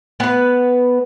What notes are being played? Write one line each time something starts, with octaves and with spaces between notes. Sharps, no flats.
B3 B4